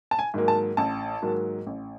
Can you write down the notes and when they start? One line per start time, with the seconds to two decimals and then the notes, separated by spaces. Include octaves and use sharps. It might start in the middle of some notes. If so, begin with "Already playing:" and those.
0.11 A5
0.19 G#5
0.34 G#2 D#3 F#3 A#3
0.48 A5
0.77 A1 A5
1.22 G#2 D#3 F#3 A#3
1.67 A1